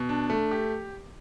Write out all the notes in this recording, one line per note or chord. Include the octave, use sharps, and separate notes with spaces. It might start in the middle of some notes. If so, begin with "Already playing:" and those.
Already playing: B2
D4
A3
G4